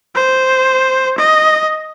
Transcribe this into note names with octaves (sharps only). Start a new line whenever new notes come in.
C5
D#5